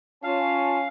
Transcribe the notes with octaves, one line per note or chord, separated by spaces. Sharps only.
C#4 F4 F5 G#5 A5